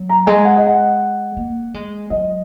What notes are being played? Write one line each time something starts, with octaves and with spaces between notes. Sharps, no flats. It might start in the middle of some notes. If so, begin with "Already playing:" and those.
Already playing: F#3
A#5
G#3 G#5
F#5
D#5
F#5
A#3
G#3
F#3 D#5